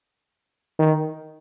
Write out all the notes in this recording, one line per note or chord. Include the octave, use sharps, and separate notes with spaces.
D#3